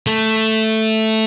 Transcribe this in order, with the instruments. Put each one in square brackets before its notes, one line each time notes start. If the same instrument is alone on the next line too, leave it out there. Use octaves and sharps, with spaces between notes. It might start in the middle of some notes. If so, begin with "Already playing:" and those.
[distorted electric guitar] A3